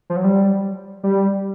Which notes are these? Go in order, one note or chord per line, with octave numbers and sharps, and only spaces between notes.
F3
F#3
G3
G3